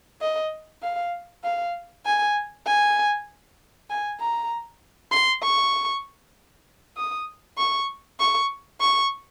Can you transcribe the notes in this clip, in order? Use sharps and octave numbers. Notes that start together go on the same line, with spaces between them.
D#5
F5
F5
G#5
G#5
G#5
A#5
C6
C#6
D#6
C#6
C#6
C#6